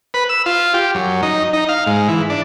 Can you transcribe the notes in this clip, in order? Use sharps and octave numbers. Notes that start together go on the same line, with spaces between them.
B4
E6
F4
G4
F#2
D#4
D#4
F5
G#2
E3
D4